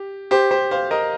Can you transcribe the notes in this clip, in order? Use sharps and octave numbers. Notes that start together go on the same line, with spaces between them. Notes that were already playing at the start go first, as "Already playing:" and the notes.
Already playing: G4
G4 C5
G4 C5
C5 F5
A#4 D#5